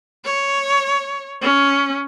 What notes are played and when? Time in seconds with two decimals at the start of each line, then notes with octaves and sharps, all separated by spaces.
0.25 C#5
1.42 C#4